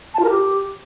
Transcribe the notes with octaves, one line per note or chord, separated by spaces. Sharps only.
A5
F4
A#4
G4